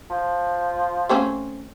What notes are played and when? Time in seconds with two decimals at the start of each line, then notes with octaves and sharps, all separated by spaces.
0.10 F3
1.09 A3 C4 C#4